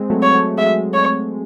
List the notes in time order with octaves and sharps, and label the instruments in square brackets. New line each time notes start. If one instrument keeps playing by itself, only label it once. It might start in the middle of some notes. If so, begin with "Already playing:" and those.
Already playing: [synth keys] G#3 C4
F#3 A3
[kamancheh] C#5
[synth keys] F#3 A3
[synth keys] G#3 [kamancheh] E5
[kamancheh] C#5